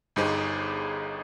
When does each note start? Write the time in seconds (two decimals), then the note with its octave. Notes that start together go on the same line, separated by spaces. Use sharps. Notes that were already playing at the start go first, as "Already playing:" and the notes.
0.16 G1 G2 D#4 G4 G#4 C5